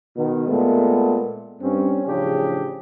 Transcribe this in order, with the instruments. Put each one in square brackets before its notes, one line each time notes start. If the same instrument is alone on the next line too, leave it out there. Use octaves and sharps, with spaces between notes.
[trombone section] B2 D#3
A#2 G#3 A3 B3
G2 C4 C#4
A1 C#3 F3 D4 G4 G#4